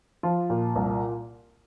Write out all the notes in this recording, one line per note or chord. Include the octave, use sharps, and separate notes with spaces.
F3 F4
A#2
C2